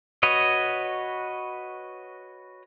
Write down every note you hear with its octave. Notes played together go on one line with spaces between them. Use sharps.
F#4 B4 C#5 D#5